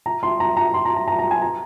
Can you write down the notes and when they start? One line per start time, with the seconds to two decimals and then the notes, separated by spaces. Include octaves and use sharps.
0.06 A#5
0.23 C6
0.40 A#5
0.57 A#5
0.74 C6
0.85 A#5
0.97 A#5
1.08 A#5
1.19 A#5
1.31 G#5
1.42 A#5